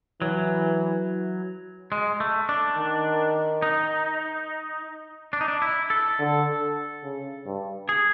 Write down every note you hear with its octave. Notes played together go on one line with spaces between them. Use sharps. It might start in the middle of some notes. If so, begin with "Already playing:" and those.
E3 F#3
G#3
A3
D4
D#3
D#4
D4
D#4
D4
E4
A4
D3
C#3
G2
G#4